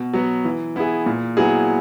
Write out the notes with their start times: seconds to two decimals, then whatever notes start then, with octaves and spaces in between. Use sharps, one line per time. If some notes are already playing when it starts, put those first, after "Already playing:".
Already playing: B2
0.14 F#3 B3
0.45 E3
0.76 B3 E4 G#4
1.06 A#2
1.37 F#3 B3 E4 G#4